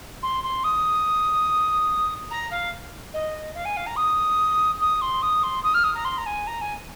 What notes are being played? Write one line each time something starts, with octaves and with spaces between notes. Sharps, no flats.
C6
C6
D#6
A#5
F5
D#5
F5
G#5
F5
A#5
D#6
D#6
C6
D#6
C6
D#6
F6
D#6
A#5
C6
A#5
G#5
A#5
G#5